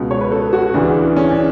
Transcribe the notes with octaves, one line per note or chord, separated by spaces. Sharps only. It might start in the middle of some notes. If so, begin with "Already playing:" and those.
Already playing: C#2 B2
C#5
B4
A4
F#4
D2 C#3 E3 D4
C#4
D4